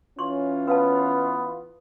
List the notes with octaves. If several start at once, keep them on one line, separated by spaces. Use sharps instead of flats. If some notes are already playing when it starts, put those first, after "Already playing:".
E3 C#4 F4 C6 C#6
B3 B4 F5 A5